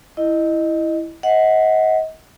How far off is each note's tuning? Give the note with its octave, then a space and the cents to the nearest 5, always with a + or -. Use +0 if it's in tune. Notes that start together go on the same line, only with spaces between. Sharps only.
E4 +0 D#5 -10
D#5 +35 F#5 +0